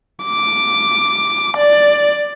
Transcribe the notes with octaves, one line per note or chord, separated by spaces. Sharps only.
D6
D5